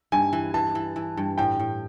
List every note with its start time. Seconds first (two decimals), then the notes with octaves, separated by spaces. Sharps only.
0.12 G2 G#5
0.33 E3
0.54 E3 A5
0.75 E3
0.96 E3
1.17 G2
1.38 A2 G5
1.59 A2